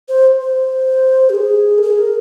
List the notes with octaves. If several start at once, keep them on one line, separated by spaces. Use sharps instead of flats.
C5
C5
G4
G#4
A#4
G#4
A#4